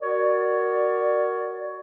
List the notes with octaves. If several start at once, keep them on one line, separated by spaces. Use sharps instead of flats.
F#4 A#4 C#5 D5